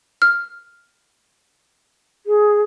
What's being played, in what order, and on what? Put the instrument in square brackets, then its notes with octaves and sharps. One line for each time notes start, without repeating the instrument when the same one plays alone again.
[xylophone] F6
[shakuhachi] G#4